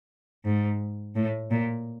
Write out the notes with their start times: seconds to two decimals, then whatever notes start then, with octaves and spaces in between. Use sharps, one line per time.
0.45 G#2
1.15 A2
1.51 A#2